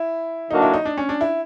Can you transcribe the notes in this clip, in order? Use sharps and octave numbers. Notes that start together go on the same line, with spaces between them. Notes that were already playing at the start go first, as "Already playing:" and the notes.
Already playing: E4
D3 F#3 A#3 D4 D#4 F#4
E4
D#4
D4
C#4
D4
E4